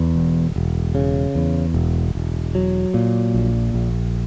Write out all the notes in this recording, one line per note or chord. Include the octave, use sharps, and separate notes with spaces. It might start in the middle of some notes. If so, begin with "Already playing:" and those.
Already playing: E2
E1
E1
C#3
E2
E1
E1
F#3
A#2
A#1
A#1